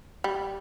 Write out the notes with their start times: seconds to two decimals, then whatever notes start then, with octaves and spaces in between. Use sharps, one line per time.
0.24 G3